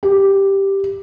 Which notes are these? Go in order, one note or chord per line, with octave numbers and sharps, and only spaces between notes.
G4